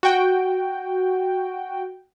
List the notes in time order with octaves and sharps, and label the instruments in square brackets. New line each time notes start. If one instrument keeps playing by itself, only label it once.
[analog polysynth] F#4 G5